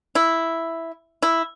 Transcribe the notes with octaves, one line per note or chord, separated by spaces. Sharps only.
E4
E4